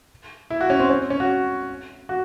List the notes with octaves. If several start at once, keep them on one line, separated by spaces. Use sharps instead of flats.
E4
F#4
C#4
C4
C#4
C#4
F#4
F#4